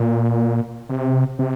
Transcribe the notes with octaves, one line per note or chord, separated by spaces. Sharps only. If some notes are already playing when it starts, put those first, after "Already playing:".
Already playing: A#2
C3
C3